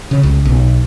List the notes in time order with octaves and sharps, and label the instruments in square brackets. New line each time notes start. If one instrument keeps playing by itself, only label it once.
[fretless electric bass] C#3
C#2
B1